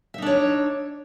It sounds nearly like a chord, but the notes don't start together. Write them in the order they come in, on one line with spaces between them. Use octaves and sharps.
E5 D#4 D4 C#5